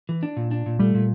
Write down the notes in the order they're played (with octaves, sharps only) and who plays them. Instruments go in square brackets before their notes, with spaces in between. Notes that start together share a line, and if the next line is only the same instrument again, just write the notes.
[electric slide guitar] E3
D4
A#2
D4
A#2
[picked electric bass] G3 [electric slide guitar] A3
[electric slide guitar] A#2